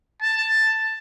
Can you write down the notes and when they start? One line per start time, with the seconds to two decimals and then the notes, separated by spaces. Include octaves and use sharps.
0.22 A5